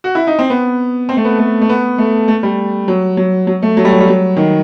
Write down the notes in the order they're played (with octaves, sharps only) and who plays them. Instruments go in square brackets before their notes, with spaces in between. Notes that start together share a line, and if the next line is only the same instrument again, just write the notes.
[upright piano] F#4
E4
D#4
C4
B3
C4
A3
B3
A3
A3
B3
A3
A3
G3
F#3
F#3
F#3
A3
F#3
G3
F#3
G3
F#3
D#3